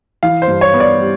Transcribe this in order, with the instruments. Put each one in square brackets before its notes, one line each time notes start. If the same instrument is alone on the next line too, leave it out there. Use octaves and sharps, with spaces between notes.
[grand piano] E3 F5
C5
G2
C#5
B3
D5
G3